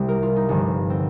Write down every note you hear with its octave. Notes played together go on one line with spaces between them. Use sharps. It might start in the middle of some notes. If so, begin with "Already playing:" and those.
Already playing: C2 C3 G3 G4
A#4
F4
D#4
G1 G2 D3 F3
C4